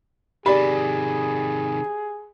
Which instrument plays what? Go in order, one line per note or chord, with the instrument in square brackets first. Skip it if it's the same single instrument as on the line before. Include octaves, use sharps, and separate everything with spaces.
[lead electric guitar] C3 D#3 [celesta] G4 [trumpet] G#4 [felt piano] D5 B5